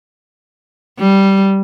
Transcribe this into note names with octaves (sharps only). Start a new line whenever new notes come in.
G3